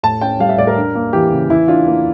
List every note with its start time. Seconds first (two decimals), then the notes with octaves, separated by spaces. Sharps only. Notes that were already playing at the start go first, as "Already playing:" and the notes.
0.03 A2 A5
0.21 C#4 G5
0.40 G3 F5
0.49 E5
0.58 A2 D5
0.67 A#4
0.77 D4
0.95 A#3
1.13 E3 G4
1.32 C#3
1.50 E3 E4
1.68 D4 F4
1.87 A#3